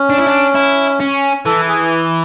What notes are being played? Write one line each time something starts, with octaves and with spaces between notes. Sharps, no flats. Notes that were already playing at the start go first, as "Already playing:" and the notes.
Already playing: C#4
D4
E4
D4
E4
C#4
E3 A4
G#4